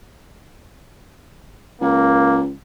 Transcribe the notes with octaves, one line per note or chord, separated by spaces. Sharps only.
C#2 A#3